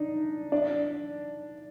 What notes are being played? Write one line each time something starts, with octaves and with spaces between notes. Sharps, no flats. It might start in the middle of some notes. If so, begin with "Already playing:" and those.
Already playing: D4 D#4
D4